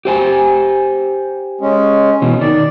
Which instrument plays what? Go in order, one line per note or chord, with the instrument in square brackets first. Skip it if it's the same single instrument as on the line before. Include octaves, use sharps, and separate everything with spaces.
[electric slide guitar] G4 C5 G#5
[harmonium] G#3 C#4
[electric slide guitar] B2 E3
[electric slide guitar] D#3 [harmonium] D5